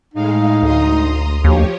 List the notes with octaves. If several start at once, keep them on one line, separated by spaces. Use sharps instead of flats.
A2 G#3 D#4 F5
D2 A#5 C6 D#6
D#2 F3 G4 C#5